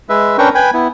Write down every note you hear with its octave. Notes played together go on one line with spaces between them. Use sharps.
G#3 B4 E5
C#4 D4 A#4 B4 G5 C#6
B4 G5 G#5 B5
B3 E4